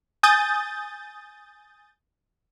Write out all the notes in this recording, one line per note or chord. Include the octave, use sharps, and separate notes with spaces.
G#5 D#6 G6 A6